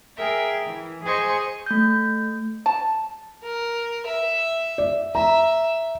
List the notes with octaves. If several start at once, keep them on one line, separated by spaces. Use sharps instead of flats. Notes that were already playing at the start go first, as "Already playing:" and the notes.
G#4 A#4 E5 G5
E3
G#4 C5 D#5 G#5 C#6
A3 G6
A5
A#4
E5
D5
E5 A#5